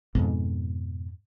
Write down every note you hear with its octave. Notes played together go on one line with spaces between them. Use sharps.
F2 G#2 B2